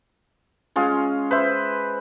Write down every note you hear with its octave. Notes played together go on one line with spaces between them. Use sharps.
G#3 C#4 F4
B4 C5 E5